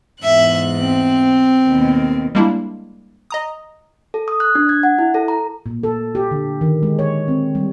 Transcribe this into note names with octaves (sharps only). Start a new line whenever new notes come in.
E2 G#2 E5 F#6
C4
D#2 B2
G3 G#3 A#3 D4 E4
D#5 A#5 D#6
A4
D#6
F#6
D4
G#6
F#5
E4
A4
A#5
A#2
A4
G4
D3
D#3
G#3
C#5
C4
G3